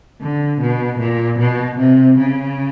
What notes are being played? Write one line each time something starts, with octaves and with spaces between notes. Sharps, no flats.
D3
B2
A#2
B2
C3
C#3